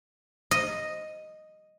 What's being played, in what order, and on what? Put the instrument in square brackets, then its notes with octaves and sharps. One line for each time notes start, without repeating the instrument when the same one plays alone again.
[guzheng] D#5